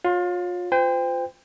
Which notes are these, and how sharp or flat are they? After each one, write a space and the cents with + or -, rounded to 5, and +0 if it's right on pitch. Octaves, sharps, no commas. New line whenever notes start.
F4 +30 C#5 +0 C6 +0
F4 +5 C5 -35 G5 +25